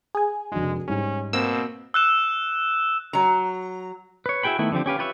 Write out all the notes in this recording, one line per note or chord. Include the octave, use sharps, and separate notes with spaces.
G#4 G#5
F1 G#3 D4 F#4
G#2 G3 C#4
B2 A#3 C4 E6
E6 F#6 E7
F#3 A#5
B4 C#5
E4 F#4 G#4 G5 B5
D#3 A3 B3 E4
D3 F3 C4 G4
C#4 G4 B4 F5
F4 G4 B4 C#5 E5